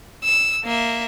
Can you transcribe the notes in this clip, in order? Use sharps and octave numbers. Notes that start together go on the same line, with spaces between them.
E6
A#3 E5